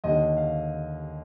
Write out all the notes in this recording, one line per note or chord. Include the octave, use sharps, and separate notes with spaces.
D#2 D3 D#5
F5